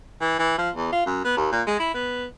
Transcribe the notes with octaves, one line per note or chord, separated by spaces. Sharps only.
E3
E3
F3
E2
F4
F#2
B3
D#2
A#2
G#3
E4
B3